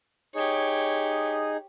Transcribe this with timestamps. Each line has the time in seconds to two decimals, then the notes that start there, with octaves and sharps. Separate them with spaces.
0.35 D#4 G4 G#4 C#5